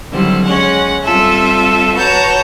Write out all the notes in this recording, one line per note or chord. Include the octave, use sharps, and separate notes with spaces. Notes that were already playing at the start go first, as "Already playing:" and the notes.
D3 D#3 F#3 G3 C4 E4
G#3 C#4 F#5
G3 C4 F4 A4 E5
F#4 B4 C#5 A5 A#5 G6